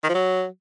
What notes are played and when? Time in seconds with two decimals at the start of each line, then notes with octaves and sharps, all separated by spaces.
0.04 D#3
0.09 F3
0.15 F#3